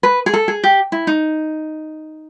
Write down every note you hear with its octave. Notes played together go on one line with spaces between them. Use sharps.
B4
G#4
A4
G#4
G4
E4
D#4